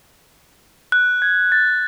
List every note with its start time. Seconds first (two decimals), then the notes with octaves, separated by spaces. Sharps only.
0.92 F#6
1.22 G#6
1.52 A6